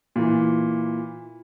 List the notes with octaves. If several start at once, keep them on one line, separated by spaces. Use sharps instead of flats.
A#2 E3